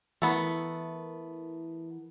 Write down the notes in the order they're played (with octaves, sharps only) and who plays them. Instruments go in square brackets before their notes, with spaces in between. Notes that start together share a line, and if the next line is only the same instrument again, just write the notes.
[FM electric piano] E3 E4 A#4 [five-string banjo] A3 B3